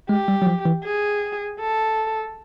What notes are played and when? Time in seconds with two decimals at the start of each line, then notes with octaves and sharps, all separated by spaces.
0.09 G#3 G4
0.28 G3
0.42 F#3
0.47 F3
0.65 E3
0.85 G#4
1.60 A4